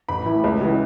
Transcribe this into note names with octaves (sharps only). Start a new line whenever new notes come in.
A1 B5
A2 E3
C#2
C#3 E3